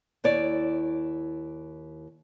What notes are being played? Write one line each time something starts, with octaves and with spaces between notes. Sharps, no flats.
D#2 E4 C#5 D5